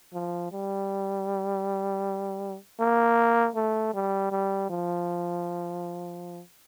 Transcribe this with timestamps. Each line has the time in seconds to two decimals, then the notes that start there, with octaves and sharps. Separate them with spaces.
0.14 F3
0.52 G3
2.80 A#3
3.55 A3
3.94 G3
4.32 G3
4.70 F3